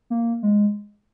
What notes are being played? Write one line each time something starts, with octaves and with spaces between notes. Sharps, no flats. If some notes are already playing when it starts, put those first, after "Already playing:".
A#3
G#3